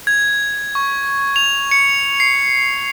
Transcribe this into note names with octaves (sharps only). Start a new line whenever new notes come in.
G#6
C#6
F7
C#7
C7